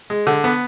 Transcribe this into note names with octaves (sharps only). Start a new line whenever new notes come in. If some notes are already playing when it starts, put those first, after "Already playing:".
G#3
D3
B3